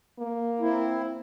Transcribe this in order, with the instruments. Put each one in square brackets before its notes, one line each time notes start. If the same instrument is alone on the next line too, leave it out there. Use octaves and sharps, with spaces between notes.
[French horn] A#3
[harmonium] C4 E4